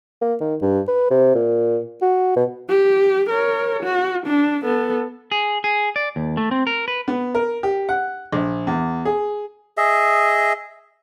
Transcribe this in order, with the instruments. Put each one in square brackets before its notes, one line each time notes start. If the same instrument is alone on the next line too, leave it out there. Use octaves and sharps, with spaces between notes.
[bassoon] A#3
D#3
G2
B4
C3
A#2
F#4
B2
[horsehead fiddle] G4
A#4 C#5
F#4
D4
B3 A4
[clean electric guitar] G#4
G#4
D5
D#2
A3
C4
A#4
B4
[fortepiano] B3
A#4
G4
F#5
A#1
E2
G#4
[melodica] G#4 D#5 E5